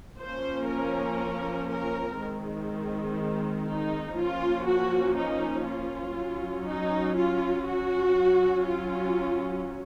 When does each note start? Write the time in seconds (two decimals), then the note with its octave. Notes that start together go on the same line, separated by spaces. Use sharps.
0.19 F3 A#3 C#4 C5
0.69 A#4
1.69 A#4
2.18 D#3 G#3 C4
3.68 D#4
4.18 F3 A#3 C#4 F4
4.67 F#4
5.17 D#4
5.67 F4
6.16 F#3 C#4
6.67 D#4
7.16 F4
7.66 F#4
8.16 F#3 C#4
8.66 F4